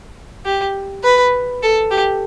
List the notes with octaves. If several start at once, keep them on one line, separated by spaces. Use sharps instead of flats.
G4
B4
A4
G4